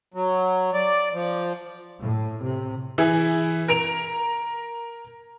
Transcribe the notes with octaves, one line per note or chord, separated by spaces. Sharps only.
F#3
D5
F3
A2
C3
E3 E4 G#4
A#4 A#5 D7 F7